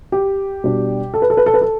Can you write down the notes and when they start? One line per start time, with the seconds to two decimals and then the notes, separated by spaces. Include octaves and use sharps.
0.12 G4
0.64 B2 G3 D4
1.14 A4
1.22 B4
1.30 A4
1.37 B4
1.46 A4
1.54 B4
1.62 A4